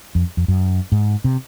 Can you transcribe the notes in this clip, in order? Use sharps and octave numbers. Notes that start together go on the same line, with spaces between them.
F2
F2
F#2
G#2
C3